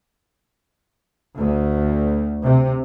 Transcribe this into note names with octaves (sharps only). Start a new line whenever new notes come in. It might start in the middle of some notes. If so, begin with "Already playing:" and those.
D2
C3